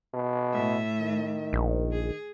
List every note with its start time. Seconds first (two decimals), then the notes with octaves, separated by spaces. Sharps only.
0.14 B2
0.53 A2 E5
1.01 D#3
1.53 A#1
1.92 G#4